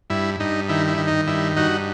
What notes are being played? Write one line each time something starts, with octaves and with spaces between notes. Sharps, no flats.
G2 E4
G2 D#4
D#3 E4
E4
D#3
D#4
G2 E4
G2 D#4 F#4